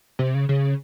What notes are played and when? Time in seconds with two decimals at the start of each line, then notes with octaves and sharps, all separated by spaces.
0.19 C3
0.34 C#3
0.49 C#3